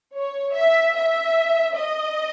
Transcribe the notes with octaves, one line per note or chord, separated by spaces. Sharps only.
C#5
E5
E5
D#5